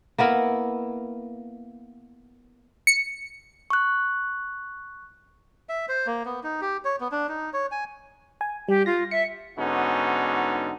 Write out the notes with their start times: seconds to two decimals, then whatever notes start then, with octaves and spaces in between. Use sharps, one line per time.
0.18 A#3 B3 E4 A#4
2.87 C#7
3.70 C#6 F#6
5.69 E5
5.89 C5
6.07 A#3
6.26 B3
6.44 D#4
6.61 G4
6.85 C#5
7.01 B3
7.12 D4
7.29 D#4
7.53 C#5
7.71 G#5
8.41 G#5
8.69 G3 G4
8.86 F4 A#6
9.11 E5 C#7
9.58 G#2 D3 B3 C#4 D#4 F#4